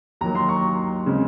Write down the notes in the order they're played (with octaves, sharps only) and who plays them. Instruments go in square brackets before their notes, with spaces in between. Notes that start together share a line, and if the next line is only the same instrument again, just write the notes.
[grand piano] D#2 D#3 F#3 A#3 A#5
C6
C#6
C#3 G#3 C4